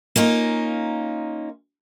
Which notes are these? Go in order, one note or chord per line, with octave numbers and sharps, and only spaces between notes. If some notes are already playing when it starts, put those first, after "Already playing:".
A#3 C#4 D#4 F4